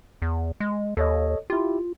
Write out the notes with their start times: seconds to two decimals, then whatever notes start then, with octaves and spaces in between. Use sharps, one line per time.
0.22 E2
0.60 G#3
0.97 D#2 A4 C#5 D#5
1.50 E4 F4 G4